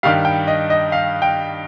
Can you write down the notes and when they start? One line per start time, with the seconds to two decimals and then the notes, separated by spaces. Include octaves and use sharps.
0.03 G2 D#3 G3 F5
0.25 G5
0.48 D#5
0.70 D#5
0.92 F5
1.22 G5